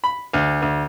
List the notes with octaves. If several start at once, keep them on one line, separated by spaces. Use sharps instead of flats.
B5
D2
D2